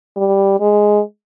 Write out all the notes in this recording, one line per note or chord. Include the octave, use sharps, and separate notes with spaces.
G3
G#3